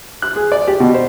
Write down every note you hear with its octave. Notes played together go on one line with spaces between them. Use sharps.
F#6
G#4
D5
G4
B2
C5